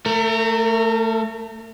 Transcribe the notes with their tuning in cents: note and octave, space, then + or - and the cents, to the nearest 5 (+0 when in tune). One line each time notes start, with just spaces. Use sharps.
A3 +15 A#4 -30